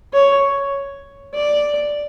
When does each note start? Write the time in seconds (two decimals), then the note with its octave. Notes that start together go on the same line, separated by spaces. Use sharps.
0.13 C#5
1.34 D5